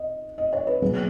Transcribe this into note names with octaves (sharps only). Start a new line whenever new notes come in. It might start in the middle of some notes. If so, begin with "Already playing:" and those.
Already playing: D#5
D#5
C#5
B4
B2 F#3 A#3 G#4